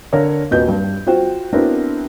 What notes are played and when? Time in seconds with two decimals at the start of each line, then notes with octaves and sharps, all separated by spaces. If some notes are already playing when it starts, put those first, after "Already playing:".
0.12 D3 A#4 C#5 F5
0.51 D#1 F#4 B4 D#5 G6
0.69 G2
1.07 F4 F#4 C5 G5
1.53 B3 C4 D4 E4 F#4 A#4